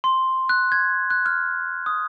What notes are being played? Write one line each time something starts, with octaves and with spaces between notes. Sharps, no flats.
C6
F#6
G#6
F#6
F6
D#6